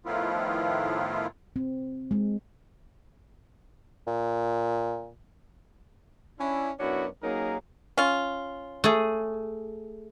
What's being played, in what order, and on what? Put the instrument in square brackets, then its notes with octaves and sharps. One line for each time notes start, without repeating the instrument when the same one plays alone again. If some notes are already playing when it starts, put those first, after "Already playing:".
[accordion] A2 D#3 F3 B3 E4 F4
[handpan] C4
G#3
[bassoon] A#2
[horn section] C#4 D4 E4
F#2 B3 C#4 D4 E4 F#4
F#3 A#3 C#4 D#4 G#4 A#4
[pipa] C#4 F4
[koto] A3 G#4